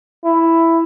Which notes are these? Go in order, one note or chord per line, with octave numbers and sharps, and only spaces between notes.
E4